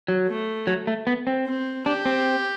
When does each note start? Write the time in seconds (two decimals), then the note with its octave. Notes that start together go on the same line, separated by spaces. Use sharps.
0.08 F#3
0.28 A3
0.67 F#3
0.87 A3
1.07 B3
1.27 C4
1.46 C4
1.86 D4 G4
2.06 C4